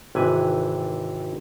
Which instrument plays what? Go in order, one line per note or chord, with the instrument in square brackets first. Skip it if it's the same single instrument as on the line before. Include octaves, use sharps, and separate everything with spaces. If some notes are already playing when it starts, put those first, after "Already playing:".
[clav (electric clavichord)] G#1 C3 E3 B4 G#5